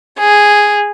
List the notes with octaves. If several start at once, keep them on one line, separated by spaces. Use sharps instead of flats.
G#4